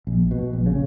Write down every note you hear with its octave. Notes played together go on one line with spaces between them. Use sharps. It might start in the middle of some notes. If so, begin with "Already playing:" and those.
A#1
B2
A#1
C#3